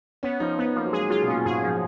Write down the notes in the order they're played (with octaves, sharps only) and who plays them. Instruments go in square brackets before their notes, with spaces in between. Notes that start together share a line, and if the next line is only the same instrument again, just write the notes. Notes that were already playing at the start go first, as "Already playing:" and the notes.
[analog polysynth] B3 [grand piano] C#4
[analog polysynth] F3 [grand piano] D#4
[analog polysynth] B3 [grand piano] C#4
[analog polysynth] F3 [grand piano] A#3
[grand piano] F#3
[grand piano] G#3 [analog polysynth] G#4
[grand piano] F#3 [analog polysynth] F4
[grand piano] B2
[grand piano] A#2 [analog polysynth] C#4
[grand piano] G#2 [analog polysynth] G#4
[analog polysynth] F3